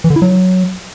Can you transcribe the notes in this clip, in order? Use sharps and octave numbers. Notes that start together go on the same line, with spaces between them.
E3
D3
E4
F#3